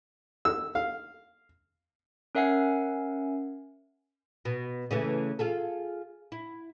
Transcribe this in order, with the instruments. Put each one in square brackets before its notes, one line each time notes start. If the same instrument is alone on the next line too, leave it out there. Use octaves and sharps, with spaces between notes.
[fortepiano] E6
F5
[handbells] C#4 A#4 E5 F#5 G#5 C7
[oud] B2
C#3 E3 A3
F4 G#4 A4
E4